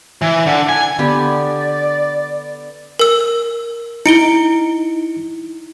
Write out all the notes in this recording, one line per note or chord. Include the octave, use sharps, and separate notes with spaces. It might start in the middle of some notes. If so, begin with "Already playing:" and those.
E3
D3
G#5
D3 B3 G4 D5
A#4 E6
D#4 E4 C#7 D7 G7